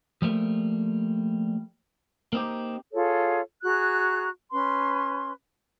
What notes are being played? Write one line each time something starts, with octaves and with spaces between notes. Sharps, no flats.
F3 G3 A3 A#3
A#3 C4 D#4 G4
F4 G#4 A4 C#5
F#4 G#4 A#5 F#6
C#4 B4 C6